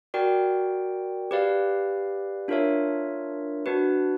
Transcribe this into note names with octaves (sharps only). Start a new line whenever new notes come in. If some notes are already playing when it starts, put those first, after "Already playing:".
F#4 A#4 D5 G5
G4 B4 D5 F5
D4 F4 A#4 C#5 E5
D4 F#4 B4